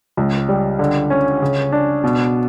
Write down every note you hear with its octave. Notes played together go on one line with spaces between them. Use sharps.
C#2
G3
D3
C#4
C#3
D4
B2